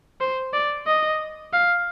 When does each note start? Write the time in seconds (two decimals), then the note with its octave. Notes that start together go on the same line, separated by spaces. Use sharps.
0.20 C5
0.53 D5
0.87 D#5
1.53 F5